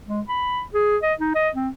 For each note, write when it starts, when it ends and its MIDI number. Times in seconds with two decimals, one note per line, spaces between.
0.08 0.21 56
0.28 0.61 83
0.74 0.97 68
1.03 1.14 75
1.19 1.32 63
1.35 1.50 75
1.54 1.69 60